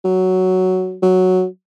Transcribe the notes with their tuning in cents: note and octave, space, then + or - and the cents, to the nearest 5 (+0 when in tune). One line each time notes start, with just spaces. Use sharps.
F#3 +5
F#3 +0